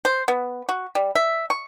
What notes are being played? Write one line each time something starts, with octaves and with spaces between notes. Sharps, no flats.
C5
B3
F#4
G3
E5
C#6